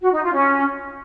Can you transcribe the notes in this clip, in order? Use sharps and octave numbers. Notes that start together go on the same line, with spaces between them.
F#4
D#4
F4
C#4